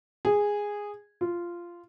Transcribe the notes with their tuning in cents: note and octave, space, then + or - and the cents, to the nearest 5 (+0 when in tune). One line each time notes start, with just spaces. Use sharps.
G#4 -10
F4 -10